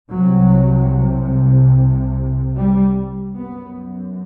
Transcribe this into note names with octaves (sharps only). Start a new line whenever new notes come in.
C2 C3 F#3
G3
F#2 B3